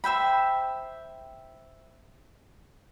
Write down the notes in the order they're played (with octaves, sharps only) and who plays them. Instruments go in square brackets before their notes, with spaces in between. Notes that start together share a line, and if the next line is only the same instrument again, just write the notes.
[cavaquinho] C5 E5 G5 B5